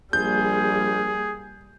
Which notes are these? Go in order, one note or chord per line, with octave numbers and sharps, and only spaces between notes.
A#1 G3 A#3 G#4 G6